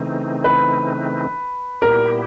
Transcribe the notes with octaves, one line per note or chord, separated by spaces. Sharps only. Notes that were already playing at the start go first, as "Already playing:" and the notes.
Already playing: C#3 E3 A3 C4 D#4
B4
A#2 G3 B3 E4 G4 A#4